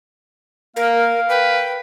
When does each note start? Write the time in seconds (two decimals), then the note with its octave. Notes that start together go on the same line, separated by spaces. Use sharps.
0.76 A#3 A#4 F5
1.29 B4 G5